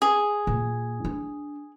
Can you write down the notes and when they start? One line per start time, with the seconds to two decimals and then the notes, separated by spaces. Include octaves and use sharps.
0.02 G#4
0.47 A#2
1.05 D4